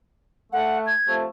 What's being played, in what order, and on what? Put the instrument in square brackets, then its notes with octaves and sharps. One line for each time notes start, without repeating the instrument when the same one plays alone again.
[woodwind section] A3 [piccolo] F#5
[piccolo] G#6
[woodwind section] C3 F3 A3